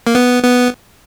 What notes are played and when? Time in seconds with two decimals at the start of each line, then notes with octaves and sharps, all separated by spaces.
0.07 A#3
0.15 B3
0.43 B3